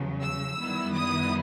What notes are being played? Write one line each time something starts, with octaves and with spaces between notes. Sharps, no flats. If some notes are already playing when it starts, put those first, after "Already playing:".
Already playing: E2 C#3 F#3
E6
F#2 D#3 G3 B3 E4
D#6